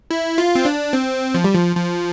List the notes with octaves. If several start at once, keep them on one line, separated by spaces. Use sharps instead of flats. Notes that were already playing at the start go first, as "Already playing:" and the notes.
E4
F4
C4
D4
C4
F3
G3
F3
F3